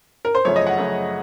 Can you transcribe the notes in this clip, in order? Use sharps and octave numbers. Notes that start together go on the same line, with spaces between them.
A#4
C5
F#2 C#3 F3 A3 C#5
D#5
F#5
F#2 C#3 F3 A3